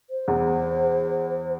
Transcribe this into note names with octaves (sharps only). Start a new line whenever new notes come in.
C5
E2